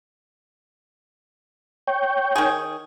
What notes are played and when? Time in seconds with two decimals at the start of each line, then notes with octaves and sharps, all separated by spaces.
1.88 C#5 G5
2.36 D#3 G#4